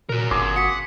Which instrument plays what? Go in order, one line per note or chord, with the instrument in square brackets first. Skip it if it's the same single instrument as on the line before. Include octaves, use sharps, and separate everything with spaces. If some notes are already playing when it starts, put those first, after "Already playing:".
[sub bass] A#2 [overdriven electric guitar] F#4 A#4
[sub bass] G1 [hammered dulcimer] G#4 C6 D6
[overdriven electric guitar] F#5 [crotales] C#6 B6 C#7